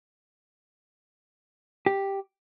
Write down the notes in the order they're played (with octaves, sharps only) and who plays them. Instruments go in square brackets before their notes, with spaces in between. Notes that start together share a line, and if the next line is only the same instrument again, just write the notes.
[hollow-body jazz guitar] G4